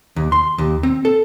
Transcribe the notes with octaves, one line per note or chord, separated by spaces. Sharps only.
D#2
C6
D#2
C4
A4